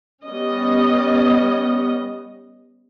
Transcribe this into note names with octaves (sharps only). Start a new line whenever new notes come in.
G3 B3 C#4 D#5